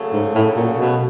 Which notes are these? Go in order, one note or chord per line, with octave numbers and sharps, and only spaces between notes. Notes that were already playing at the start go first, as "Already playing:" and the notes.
Already playing: F#2 C#3 F#3 A3
G#2
A2
A#2
B2